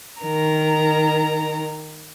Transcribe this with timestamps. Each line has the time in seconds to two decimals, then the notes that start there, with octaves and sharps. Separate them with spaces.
0.21 D#3 A#4 A#5